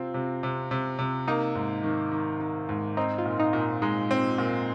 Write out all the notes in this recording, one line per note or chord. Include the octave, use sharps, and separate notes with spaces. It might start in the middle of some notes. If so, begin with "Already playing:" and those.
Already playing: C3 C4 F4
C3
C3
C3
C3
A#3 D#4
G#2
D#3
D#3
D#3
G#2
C4 D#4
F4
A#2
D#4
A#2
D#4
G#3 D#4
C4
A#2